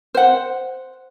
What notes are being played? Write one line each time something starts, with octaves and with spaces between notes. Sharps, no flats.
C5 F#5